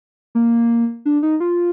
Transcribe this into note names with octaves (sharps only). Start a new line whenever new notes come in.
A#3
D4
D#4
F4